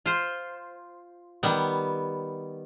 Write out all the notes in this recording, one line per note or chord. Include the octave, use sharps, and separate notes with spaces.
F4 C5
D#3 G3 B3